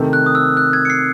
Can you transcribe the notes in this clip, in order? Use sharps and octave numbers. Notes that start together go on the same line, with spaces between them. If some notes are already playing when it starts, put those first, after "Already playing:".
Already playing: C3 D#3 A3
F#6
D#6
E6
F#6
G#6
C#7
C7